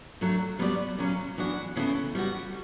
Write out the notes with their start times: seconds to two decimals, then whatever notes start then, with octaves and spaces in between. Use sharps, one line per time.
0.21 F#3 A3 D4
0.59 G3 B3 F#4 A4 D5
0.99 C#3 F#3 C#4
1.38 E3 B3 D4 F#4
1.76 C#3 E3 B3 E4 A4
2.15 G3 B3 F#4